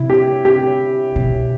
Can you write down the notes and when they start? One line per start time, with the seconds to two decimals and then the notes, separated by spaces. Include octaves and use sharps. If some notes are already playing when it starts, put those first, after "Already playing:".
Already playing: C3 E4
0.10 G4
0.45 G4
1.16 B2